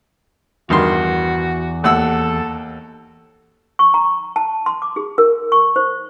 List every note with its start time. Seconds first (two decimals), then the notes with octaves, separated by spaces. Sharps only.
0.70 E2 G2 D#3 F#4 C6
1.84 D#2 A4 F#5 E6
3.79 C#6
3.94 A#5
4.36 A5
4.66 C6
4.82 D6
4.96 G#4
5.18 A#4
5.52 C#6
5.76 C5